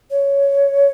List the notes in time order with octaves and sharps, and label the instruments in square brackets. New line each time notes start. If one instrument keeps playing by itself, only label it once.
[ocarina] C#5